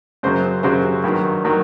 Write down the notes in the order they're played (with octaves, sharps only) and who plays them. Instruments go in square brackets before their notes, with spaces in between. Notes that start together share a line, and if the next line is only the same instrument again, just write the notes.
[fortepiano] F#2 C#3 F#3 C5
F#2 C#3 F#3 C5
G2 D#3 F#3
D#3 F#3